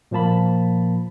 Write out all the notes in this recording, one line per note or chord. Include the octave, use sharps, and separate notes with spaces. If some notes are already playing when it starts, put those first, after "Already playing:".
A#2 F3 A#3 A5 B5